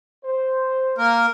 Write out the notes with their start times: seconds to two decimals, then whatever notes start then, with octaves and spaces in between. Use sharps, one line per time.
0.25 C5
0.98 A#3 A#4